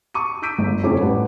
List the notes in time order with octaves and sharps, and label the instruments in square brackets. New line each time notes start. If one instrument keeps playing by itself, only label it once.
[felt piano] A5 C#6 D#7
D6 E6 G6 B6 D7 D#7
G1
F1 F2 C#4 C#5 D6
A1 G3 B4 A5